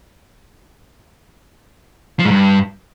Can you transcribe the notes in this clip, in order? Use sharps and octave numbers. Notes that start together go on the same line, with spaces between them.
F3
G#2
G2